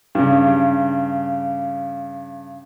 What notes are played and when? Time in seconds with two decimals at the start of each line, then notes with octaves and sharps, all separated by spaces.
0.15 G2 C#3